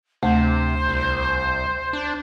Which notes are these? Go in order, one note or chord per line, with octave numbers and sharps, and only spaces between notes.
D2 C3 A3 C5
C2
D4